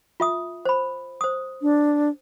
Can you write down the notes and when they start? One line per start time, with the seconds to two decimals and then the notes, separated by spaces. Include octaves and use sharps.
0.20 F4 E5 D#6
0.65 C5 B5
1.21 C5 D#6
1.62 D4